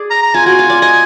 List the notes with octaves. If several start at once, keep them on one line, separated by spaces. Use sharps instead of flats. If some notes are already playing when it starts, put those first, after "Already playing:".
Already playing: G#4 D5
A#5
A#5
F4 G#5
F#4 G#5
F4
D5
D#5 G#5